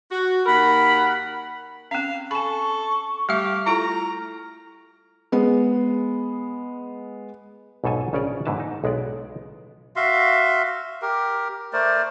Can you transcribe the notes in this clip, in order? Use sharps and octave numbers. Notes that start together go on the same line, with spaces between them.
F#4
D#2 A#4 F#5 B5
C4 C#4 F5
A4 G#5 B5 C#6
G3 A3 G4 E5 F6
E4 F4 A4 A#5
G#3 B3
B1 G#2 B2 A4 G#5
A#1 C#3 C#4 C#5 D5
G#2 B2 D3 B4 A5
D#4
B1 G#3 B3 D5
F#4 E5 F5 C6
G4 A#4
A3 A#4 C5 D5